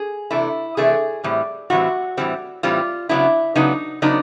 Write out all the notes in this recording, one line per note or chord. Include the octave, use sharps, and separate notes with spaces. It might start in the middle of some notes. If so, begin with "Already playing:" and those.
Already playing: G#4
C3 E3 A3 D4 E4
C3 E3 A3 D4 G#4
A2 E3 G3 C4
A2 E3 G3 C4 F#4
A2 E3 G3 C4
A2 E3 G3 C4 F4
C#3 F#3 B3 D4 E4
C#3 F#3 B3 D4 D#4
C#3 F#3 B3 D4 D#4